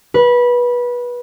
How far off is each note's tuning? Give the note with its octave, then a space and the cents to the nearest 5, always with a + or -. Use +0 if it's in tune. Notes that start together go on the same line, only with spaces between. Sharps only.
B4 -20